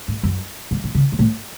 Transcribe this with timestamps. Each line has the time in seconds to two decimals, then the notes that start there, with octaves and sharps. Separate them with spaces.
0.08 A2
0.23 F#2
0.71 G#2
0.84 A2
0.95 C#3
1.12 G#2
1.19 A2